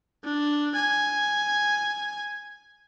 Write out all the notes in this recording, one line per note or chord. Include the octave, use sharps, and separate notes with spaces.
D4
G#5